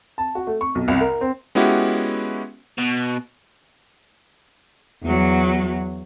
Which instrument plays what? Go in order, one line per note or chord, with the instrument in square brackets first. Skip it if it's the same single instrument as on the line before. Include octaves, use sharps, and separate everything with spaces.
[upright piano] A5
F#4
A3
C#6
B1
C2
A#4
C4
[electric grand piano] G#3 B3 C#4 E4 F#4 G4
[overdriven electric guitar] B2
[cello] E2 F#3